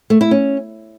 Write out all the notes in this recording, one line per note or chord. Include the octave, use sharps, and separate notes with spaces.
A3
E4
C#4